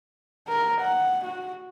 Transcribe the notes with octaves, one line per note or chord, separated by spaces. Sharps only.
A#4
F#5
F#4